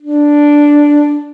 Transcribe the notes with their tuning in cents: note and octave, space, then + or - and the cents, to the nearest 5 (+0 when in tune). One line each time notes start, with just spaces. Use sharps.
D4 -5